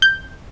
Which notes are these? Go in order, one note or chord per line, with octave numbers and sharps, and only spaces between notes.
G6